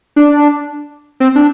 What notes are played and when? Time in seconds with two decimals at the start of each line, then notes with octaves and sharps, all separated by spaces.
0.16 D4
1.20 C4
1.35 D4